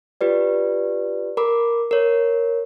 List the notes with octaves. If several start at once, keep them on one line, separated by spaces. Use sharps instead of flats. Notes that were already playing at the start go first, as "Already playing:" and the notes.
F4 G4 B4 D5
A#4 B5 D6
A#4 C#5